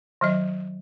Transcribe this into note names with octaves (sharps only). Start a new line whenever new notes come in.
D#3 F#3 D#5